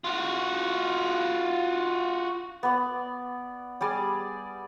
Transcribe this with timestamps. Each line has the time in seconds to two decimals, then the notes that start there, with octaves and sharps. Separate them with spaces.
0.04 F4 F#4
2.63 B3 D5
3.81 G3 G#4 D5